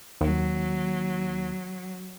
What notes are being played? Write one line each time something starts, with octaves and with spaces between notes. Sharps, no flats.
D#2 F#3